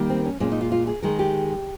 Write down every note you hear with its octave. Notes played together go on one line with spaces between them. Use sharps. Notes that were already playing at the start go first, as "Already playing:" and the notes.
Already playing: D#3 G3 A#3
C4
C#4
A#2 G#3 C#4
D#4
F4
F4
G#4
D#3 G#3 A#4
G4